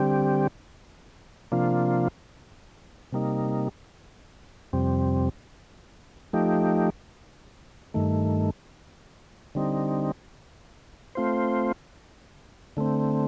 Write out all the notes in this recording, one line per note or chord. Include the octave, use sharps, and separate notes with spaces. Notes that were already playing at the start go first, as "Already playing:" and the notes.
Already playing: D3 G3 C4 G4
C3 F3 A#3 D4 F4
C3 G3 A#3 D#4
F2 C3 G3 C4
F3 A3 D#4 G4
G2 D#3 A3
D3 G3 C4 D#4
A3 C4 F4 C5
D3 A3 C4